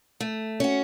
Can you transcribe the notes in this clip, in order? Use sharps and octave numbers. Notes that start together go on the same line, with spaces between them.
A3
C#4 F#4